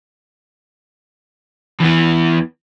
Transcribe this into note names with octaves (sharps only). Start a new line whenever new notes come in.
E2 E3